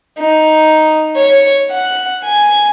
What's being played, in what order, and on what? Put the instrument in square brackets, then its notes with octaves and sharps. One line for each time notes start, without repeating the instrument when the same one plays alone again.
[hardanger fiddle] D#4
C#5
F#5
G#5